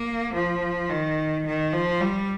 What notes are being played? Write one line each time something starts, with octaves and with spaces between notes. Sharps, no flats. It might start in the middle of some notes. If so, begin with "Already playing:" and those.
Already playing: A#3
F3
D#3
D#3
F3
G3